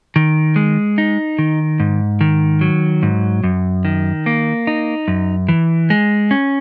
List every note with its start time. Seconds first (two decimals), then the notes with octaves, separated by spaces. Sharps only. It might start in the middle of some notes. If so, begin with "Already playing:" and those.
0.16 D#3
0.56 G#3
0.98 D#4
1.39 D#3
1.80 G#2
2.21 D#3
2.61 F#3
3.03 G#2
3.44 F#2
3.85 D#3
4.26 A#3
4.67 D#4
5.08 F#2
5.49 E3
5.90 G#3
6.31 C#4